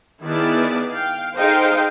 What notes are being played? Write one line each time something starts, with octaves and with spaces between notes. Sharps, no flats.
D#3 B3 E4 G#4 D5 A5
F5 G5
D#4 G#4 A4 C5 F5 G5